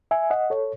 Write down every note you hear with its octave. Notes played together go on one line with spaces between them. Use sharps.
E5 G#5
D#5 F#5
A4 C#5